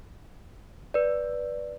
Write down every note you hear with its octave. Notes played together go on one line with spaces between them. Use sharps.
B4 D5